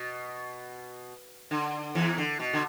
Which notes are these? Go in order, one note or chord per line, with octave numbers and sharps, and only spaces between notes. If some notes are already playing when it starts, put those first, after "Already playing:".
Already playing: B2
D3
E2 E3
D3
B2
D3